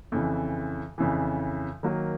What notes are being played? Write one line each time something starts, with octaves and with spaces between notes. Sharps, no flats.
F2 C#3 E3
F2 C#3 E3
D#3 F#3 A#3